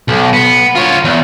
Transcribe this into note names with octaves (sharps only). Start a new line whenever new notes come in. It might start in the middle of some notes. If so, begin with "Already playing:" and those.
B1
B3
F4 C#5
E2